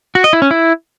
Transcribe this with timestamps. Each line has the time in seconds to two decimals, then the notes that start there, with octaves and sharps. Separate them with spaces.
0.15 F#4
0.24 D#5
0.33 E4
0.42 C#4
0.51 E4